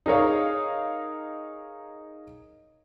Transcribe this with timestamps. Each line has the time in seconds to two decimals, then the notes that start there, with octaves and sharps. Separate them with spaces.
0.06 D#4 G#4 A#4 C#5 F5